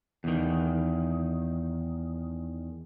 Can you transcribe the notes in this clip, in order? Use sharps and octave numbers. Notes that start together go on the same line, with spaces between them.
E2 D#3